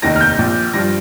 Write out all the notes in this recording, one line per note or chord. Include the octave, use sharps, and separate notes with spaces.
F1 D#2 D#3 A#6
F6
G6
A#1 A#2 F3
G2 F3 A#6